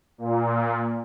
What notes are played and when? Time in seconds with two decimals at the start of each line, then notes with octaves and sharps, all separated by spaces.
0.18 A#2